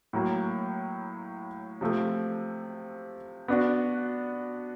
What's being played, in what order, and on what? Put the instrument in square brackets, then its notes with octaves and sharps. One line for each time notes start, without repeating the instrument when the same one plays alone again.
[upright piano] A2 F#3 A#3
C3 F3 A3
B3 D4 F#4